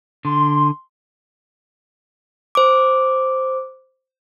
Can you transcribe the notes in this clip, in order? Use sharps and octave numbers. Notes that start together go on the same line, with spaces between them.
D3 C6
C5 D6